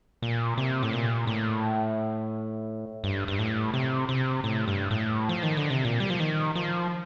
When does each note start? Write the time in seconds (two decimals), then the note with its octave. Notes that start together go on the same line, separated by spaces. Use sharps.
0.22 A#2
0.58 C3
0.83 A2
0.93 A#2
1.27 A2
3.04 G2
3.28 G2
3.39 A2
3.74 C3
4.09 C3
4.44 A2
4.68 G2
4.91 A2
5.29 F3
5.43 D#3
5.57 D3
5.70 C3
5.85 A#2
6.00 G3
6.10 F3
6.20 D#3
6.55 F3